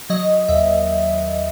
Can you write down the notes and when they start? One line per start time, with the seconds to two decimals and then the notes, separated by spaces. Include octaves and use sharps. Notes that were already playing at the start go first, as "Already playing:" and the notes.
0.10 F#3 D#5
0.48 D#2 E5